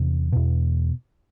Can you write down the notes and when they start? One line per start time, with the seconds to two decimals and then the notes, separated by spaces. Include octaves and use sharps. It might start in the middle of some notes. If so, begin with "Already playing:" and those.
Already playing: E2 C3
0.33 E2 B2